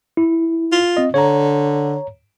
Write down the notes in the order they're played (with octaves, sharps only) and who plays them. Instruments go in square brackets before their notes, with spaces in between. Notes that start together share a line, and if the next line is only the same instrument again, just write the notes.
[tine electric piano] E4
[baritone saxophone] F4
[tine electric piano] C4 D#5
[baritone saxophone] D3 [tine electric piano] C#5 A#5